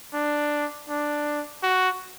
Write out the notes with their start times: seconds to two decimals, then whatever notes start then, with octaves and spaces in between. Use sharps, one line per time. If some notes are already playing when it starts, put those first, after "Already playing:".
0.13 D4
0.89 D4
1.63 F#4